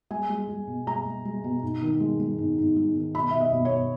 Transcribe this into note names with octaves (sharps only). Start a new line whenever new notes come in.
G#3 G#5
G#3
G#3
B2
G#3 A#5
G#3
G#3
B2
G#2
D#3
G#3
G#3
G#2
G#2
G#3
D#3
B2 B5
B2 E5
D#5
B2
C#5
B2